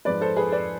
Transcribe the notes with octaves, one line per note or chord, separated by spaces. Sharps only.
G#2 F3 G#3 B4 D5
A4 C5
G#4 B4
B4 D5